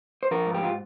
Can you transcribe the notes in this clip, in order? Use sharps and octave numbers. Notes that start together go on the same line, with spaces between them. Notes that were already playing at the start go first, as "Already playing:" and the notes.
C5
F3 A#4
G#2
G4
F4